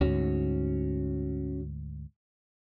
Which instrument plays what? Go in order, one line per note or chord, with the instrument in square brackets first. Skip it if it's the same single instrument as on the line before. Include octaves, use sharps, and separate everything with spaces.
[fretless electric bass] D2 G#2 [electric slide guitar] C#4 F#4 C#5